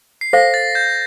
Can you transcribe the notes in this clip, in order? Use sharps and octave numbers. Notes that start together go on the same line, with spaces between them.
C7
A4 C5 F5 A#6
A6
G6